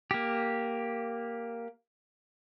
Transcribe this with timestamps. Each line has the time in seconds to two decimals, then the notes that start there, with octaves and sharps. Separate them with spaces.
0.11 A#3 G4